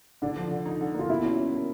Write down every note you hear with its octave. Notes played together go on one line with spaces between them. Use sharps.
D3 D4
F3
D3
D#4
D3
A#3 F4
B2 E4
C#4
C#4
A#3